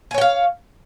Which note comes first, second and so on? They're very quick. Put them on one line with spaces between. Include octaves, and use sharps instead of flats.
G#5 C#5 G5 F5